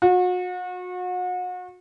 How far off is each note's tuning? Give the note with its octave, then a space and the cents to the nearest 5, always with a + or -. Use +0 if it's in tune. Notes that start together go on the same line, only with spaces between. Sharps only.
F#4 -35